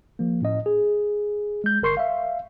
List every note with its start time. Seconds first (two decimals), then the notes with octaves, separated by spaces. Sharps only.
0.19 F3 A#3
0.42 A2 C#4 D#5
0.66 G#4
1.64 G#3 G6
1.82 G1 A#4 C6 C#6 C7
1.97 E5 F5